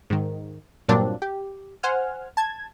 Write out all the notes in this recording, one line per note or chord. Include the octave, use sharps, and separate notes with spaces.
G#2 D#3
G2 A#2 F#3 A#3 C4 D4
G4
C5 F#5 G#5 F6
A5 G#6